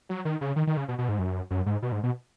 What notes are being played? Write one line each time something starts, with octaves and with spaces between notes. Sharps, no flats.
F#3
D#3
C#3
D#3
D#3
C#3
B2
B2
G#2
F#2
F#2
G#2
B2
G#2
B2